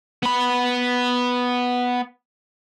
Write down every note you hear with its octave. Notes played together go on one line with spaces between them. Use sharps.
B3 B5